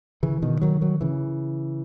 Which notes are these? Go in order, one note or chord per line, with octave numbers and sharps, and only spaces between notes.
C#3 E3
B2 D#3
D#3 F#3
D#3 F#3
C#3 E3